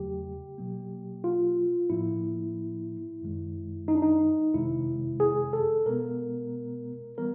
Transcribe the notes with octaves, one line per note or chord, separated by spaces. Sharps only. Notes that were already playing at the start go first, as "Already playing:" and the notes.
Already playing: E2 C#3 F#3 A3 G4
B2 F#3 A#3
F4
A2 F3 A#3 E4
F#2 D#3 G#3
D#4
D4
D#4
F2 C3 D#3 G#3 E4
G#4
A4
B2 G#3 B3 A#4
E3 G3 B3 A#4